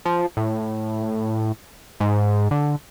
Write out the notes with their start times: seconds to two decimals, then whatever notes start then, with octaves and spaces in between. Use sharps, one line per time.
0.05 F3
0.37 A2
2.00 G#2
2.51 D3